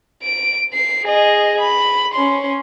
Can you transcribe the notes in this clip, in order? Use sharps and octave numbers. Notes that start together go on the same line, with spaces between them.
D7
C7
G#4 D#5
B5
C#4 C6